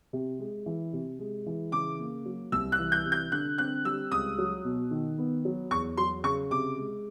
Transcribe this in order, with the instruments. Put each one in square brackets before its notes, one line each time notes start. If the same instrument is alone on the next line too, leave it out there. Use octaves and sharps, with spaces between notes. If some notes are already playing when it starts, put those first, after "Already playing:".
[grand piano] C3
G#3
E3
C3
G#3
E3
[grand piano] C#3 [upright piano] D6
[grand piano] A#3
F#3
[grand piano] C2 [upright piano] E6
[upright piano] F#6
[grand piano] E3
[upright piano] G6
[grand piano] C3
[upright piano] G6
[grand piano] D3 [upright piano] F#6
[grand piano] C4 [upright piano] F#6
[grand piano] G3 [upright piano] E6
[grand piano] C#2 [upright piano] D#6
[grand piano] F#3
B2
D#3
B3
F#3
[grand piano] E2 [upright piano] C#6
[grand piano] F#3 [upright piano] C6
[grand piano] C#3 [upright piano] C#6
[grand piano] C3 [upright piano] D6
[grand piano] G#3